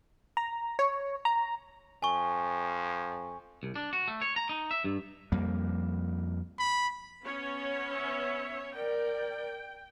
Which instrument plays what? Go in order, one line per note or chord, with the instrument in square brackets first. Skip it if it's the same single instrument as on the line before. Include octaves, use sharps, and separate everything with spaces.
[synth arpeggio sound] A#5
C#5
A#5
[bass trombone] F2 [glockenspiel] G#5 C#6
[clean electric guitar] C2
D4
F#4
A3
C#5
A#5
D#4
E5
G2
[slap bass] F2 G3 A#3
[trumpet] B5
[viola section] B3 C#4 C#5
[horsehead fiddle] E5
[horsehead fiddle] A#4 D5 [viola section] G5